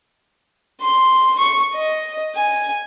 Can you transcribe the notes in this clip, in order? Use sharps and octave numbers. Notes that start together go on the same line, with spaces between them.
C6
C#6
D#5
G#5